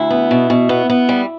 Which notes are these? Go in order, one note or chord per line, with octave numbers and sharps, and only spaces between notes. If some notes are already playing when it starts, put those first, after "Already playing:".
Already playing: D2 E4
B3
B2
B2
B3
B3
G3